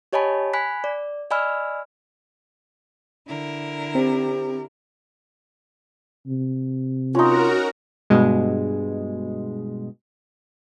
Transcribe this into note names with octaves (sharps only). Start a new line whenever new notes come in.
G4 C#5 D#5 G#5 A5 B5
G#5 B5 F#6 B6
D5
D5 D#5 G#5 B5 E6 F6
D3 E4 A#4
C4 G4
C3
C#4 D#4 F4 F#4 A#4 A#5
G2 B2 G#3